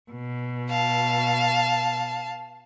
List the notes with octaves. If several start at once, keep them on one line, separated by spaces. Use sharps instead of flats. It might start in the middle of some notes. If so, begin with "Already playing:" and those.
B2
F5 A5